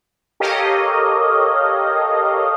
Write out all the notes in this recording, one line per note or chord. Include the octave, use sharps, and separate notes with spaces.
G4 A4 A#4 C#5 D#5 F5